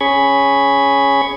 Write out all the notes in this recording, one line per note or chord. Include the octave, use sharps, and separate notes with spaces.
C#4 G#4 B5 C#6 G#6